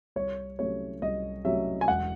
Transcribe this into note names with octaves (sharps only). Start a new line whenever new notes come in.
C2 C#5
C3 F#3 A3 C#4 C#5
C2 D#5
C3 F#3 A3 C#4 E5
G#5
E1 F#5